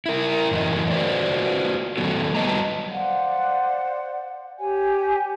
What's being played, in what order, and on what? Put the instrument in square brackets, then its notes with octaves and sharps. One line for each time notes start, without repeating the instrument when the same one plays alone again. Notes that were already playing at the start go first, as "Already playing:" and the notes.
[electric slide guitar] E4 A#4
F#2 A2 E3 A#4 D#5
F4 F#4 B4 C5 D5
A2 D#3 F#3 B3 F#4 A4
F#3 G3 B4 D#5 A5 A#5
[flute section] C5 D5 F5 F#5
G4 C#5 G#5